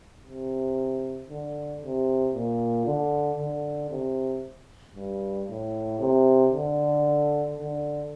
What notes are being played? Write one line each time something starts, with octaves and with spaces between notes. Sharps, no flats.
C3
D3
C3
A#2
D3
D3
C3
G2
A2
C3
D3
D3